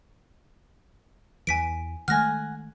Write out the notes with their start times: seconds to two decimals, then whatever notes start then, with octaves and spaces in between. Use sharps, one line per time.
1.47 E2 E3 G#5 B6 D7
2.08 D#3 G#3 A3 F#5 G#5 F6 A#6